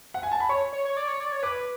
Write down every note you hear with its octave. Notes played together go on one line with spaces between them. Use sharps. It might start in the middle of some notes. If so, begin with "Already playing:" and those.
F#5
G#5
A5
B5
C#5 C#6
C#5
C#5
D5
C#5
D5
C#5
B4 D6